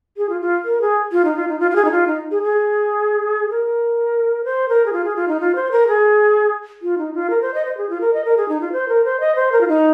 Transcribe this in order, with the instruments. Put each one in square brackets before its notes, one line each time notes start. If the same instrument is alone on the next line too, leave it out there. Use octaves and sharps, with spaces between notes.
[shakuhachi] G#4
F4
F4
A#4
G#4
F4
D#4
F4
D#4
F4
F4
G#4
D#4
F4
D#4
G#4
G#4
A#4
C5
A#4
G#4
F4
G#4
F4
D#4
F4
C5
A#4
G#4
F4
D#4
F4
A#4
C5
D#5
C5
G#4
F4
A#4
D#5
A#4
G#4
D#4
F4
C5
A#4
C5
D#5
C5
A#4
F4
D#4